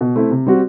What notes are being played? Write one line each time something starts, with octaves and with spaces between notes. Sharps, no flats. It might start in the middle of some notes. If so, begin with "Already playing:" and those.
B2
A3 C4 E4
C3
G3 C4 F#4